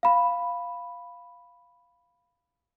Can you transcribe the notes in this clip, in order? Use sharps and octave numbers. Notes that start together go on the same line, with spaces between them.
F5 B5